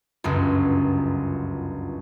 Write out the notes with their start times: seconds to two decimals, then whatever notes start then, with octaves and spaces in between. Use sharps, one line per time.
0.24 G1 C#2 F#2